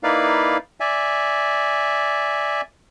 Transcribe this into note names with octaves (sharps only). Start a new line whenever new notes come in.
A#3 D#4 E4 B4 D5 F5
D5 E5 G#5